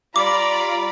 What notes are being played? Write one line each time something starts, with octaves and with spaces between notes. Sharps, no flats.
G3 F4 D5 A#5 B5 D6